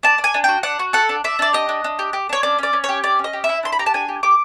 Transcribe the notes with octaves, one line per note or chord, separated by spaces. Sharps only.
D4 A5
D4
G#5
D4
F#4 G5
D4 F#5
F#4
A4 F#5
D4
D4 E5
D4 D5
G4 D#5
D4
D4
G4
G4
D4 C#5
C#4 D5
C#4 D5
C#4
C#5
G4
C#4 D5
C#4
D#5
G4
E5
E4
D4 C6
B5
G4 A#5
A5
D4 G#5
G4
G4 D6